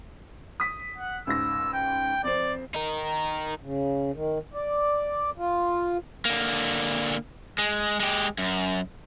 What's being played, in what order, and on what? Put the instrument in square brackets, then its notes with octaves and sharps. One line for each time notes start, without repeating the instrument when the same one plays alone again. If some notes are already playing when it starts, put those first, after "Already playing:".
[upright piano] D#6 B6
[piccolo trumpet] F#5
[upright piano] C#2 G#2 A#6 [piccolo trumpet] E6
[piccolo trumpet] G5
[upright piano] F2 C4 [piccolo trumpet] D5
[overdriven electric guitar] D#4 A#4
[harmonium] C#3
D#3
D5
F4
[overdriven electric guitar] D3 A#3
G#3
G#3 G4
F#2